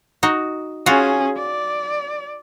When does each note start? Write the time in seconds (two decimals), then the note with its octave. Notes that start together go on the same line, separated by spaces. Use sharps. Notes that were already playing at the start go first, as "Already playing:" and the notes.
0.23 D#4 F#4
0.86 C#4 F4 F#4 G#4
1.36 D5